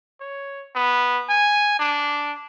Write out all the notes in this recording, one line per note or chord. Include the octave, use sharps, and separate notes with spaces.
C#5
B3
G#5
D4